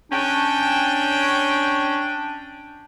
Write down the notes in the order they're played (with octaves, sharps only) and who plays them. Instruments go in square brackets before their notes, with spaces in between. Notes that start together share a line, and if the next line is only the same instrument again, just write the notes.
[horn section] C#4 G5 [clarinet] D4